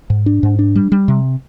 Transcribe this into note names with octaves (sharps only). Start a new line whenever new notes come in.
G#2
D4
G#2
D4
G3
G3
C3